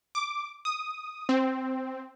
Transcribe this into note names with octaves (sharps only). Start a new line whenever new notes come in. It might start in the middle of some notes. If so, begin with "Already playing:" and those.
D6
D#6
C4